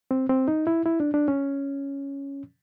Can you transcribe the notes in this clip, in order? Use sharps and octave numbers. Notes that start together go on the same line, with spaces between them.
C4
C4
D#4
E4
E4
D4
D4
C#4